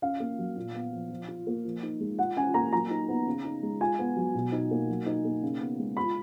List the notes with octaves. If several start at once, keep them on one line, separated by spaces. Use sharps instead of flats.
C#4 F5
A#3
F#3
A#2
B3
F3
F3
F4
A#3
F3
D#4
G#3
F4 F#5
C#4 G#5
A#3 A#5
F#3 A#5
D#4
B3
C#3
D#4
G#3
F4 G#5
B3
F#3
B2
D#4
A#3
F#3
D#4
A#3
C#3
B3
G#3
F4 B5